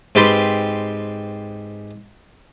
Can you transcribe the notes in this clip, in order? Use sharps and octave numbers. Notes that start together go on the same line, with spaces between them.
G#2 C4 G4 B4 A5 C6